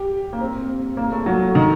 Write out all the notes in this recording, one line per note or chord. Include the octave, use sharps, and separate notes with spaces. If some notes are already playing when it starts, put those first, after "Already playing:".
Already playing: G4
A#3
C4
A#3
A3
F#3
D#3